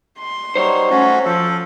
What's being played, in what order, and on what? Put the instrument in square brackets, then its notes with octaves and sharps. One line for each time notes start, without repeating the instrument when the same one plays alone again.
[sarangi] C6
[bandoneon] F#3 G3 D#4 [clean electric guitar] C5 C#5
[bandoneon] F#3 A3 F#4 [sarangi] C#4
[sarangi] F3 [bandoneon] A4